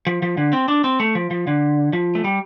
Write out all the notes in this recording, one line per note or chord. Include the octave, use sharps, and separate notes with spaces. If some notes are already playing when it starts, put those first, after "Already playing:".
F3
F3
D3
C4
D4
C4
A3
F3
F3
D3
F3
A3
G3